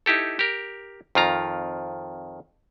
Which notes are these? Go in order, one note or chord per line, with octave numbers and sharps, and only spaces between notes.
D#4 E4 G4 A4
G4 A#4
F2 D#3 F4 A#5